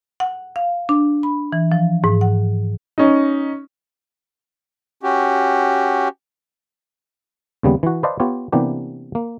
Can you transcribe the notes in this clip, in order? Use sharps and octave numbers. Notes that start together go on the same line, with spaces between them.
F#5
F5
D4
B5
E3
F3
G#2
F#5
C#4 D#4
C#4 F#4 G4
D#2 C#3 G3 B3
E3 F#4
B4 C5 D5 D#5 F5 A5
B3 F4 G4 C#5
C3 E3 A#3 B3 D4 G4
A#3